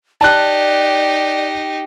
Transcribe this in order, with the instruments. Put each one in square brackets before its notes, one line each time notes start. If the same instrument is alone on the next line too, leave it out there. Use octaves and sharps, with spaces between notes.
[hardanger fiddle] D#4 G4 [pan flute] D5 [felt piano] A5 F#6